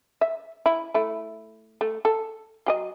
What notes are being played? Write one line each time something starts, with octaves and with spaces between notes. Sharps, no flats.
E5
E4
A3 E4
A3
A4
F#3 G4 D#5